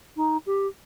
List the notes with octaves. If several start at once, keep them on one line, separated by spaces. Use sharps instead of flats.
D#4
G4